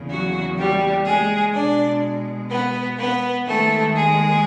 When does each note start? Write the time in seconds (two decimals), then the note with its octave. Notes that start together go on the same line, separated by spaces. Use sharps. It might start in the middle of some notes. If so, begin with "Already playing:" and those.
Already playing: E2 C#3 A#3
0.09 F#3 F#4
0.57 G3 G4
1.05 G#3 G#4
1.54 B2 G#3 D4 D5
2.50 B3 B4
2.98 B3 B4
3.46 D#2 D#3 G#3 A3 A4
3.94 G#3 G#4